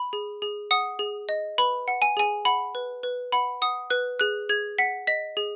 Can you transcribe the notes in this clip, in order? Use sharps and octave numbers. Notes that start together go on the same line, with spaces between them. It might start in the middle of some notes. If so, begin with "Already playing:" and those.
Already playing: B5
G#4
G#4
F#5 D#6
G#4
D#5
B4 B5
F#5
G#5
G#4 G#5
F#5 B5
B4
B4
F#5 B5
F#5 D#6
B4 F#6
G#4 F#6
G#4 G#6
F#5 B6
D#5 B6
G#4